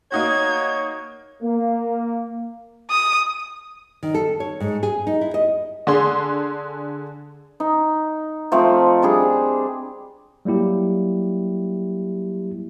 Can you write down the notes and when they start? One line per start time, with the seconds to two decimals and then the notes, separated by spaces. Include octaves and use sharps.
0.12 A#3 D#4 F#4 C#5 G#6
1.43 A#3
2.90 D#6
4.03 D#3
4.14 A4
4.40 C#5
4.60 G#2
4.83 G#4
5.07 D#4
5.21 E4
5.34 D#5
5.87 D3 G#4 C6
7.60 D#4
8.52 F3 A3 C4
9.02 G3 D4 G#4
10.45 F#3 G3 A#3 E4 G4